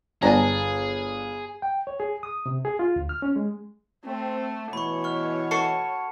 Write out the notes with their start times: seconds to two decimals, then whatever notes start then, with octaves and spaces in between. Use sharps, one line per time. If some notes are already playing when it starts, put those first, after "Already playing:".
0.23 G1 D4 G#4 D5 G#5 A#5
1.62 G5
1.87 C#5
2.00 G#4
2.23 D#6
2.46 C3
2.65 G#4
2.79 F4
2.96 D2
3.09 F6
3.22 C#4
3.36 G#3
4.05 A3 C4
4.73 B2 E3 C#5 B5 C#6
5.04 C#6 F6
5.51 F#4 A4 A5 C#6 C7 C#7